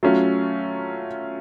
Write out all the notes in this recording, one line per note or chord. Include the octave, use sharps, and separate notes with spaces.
F#3 A3 C#4 F4